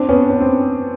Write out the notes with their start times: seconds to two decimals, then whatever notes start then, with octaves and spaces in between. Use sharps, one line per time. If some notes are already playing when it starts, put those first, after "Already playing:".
Already playing: C4 D4
0.09 B3 C#4
0.30 C#4
0.41 C4